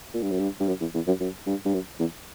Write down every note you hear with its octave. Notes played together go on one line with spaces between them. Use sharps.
A#2
G2
F#2
G2
G2
F#2
E2
E2
F#2
F#2
G2
G2
F#2
E2